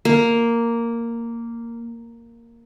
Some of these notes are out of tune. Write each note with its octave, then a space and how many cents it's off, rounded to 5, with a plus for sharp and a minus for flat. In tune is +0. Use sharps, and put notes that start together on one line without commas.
A#3 -5